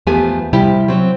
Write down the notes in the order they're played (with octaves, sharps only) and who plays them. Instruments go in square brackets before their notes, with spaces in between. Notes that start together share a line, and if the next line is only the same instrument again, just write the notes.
[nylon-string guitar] E2 F3 A3 B3 G4 G#5
C3 F3 G3 E4 G4
F#3 C4